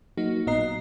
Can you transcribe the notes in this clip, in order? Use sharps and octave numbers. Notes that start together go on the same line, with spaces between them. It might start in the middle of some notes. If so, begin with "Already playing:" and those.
F#3 A#3 D#4 F#4
A1 A#2 B3 D#5 A#5 C7